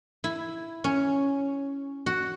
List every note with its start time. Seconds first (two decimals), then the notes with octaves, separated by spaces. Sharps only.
0.24 E4
0.84 C#4
2.06 F#4